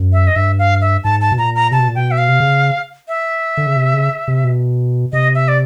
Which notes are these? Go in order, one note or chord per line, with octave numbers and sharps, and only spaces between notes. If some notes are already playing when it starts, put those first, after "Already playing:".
Already playing: F#2
E5
D#5
G2 E5
F5
E5
G#2 A5
A5
B2
A#2 A#5
A#5
C3 A5
B2
A#2
B2 G5
E5
F5
C3
C#3
E5
D3
C#3
C3
C#3
C3
B2
C3 D#5
E5
D5